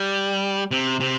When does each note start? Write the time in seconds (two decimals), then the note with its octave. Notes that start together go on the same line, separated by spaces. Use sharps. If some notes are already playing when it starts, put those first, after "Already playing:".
Already playing: G3
0.71 C3
1.00 C3